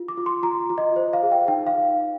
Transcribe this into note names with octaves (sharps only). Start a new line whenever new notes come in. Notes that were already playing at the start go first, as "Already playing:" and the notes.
Already playing: F4
D6
F4
C6
F4 A#5
F4
D#5
C5
F5
G#4
G5
D#4 G5
F5